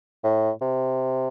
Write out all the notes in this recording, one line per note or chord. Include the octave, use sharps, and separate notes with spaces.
A2
C3